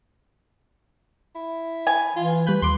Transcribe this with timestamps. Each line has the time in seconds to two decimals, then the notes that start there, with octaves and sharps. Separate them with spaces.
1.35 E4
1.87 G#5
2.16 E3 F4
2.47 G3 B4 G6
2.62 D#2 C6 D6